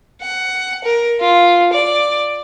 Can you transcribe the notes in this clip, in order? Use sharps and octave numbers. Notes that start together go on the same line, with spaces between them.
F#5
A#4
F4
D5